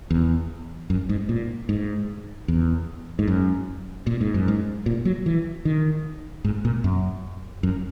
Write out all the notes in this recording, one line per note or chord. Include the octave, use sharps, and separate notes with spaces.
E2
F#2
G#2
A#2
G#2
E2
G#2
F#2
A#2
G#2
F#2
G#2
A#2
F#3
E3
D#3
G#2
A#2
F#2
F#2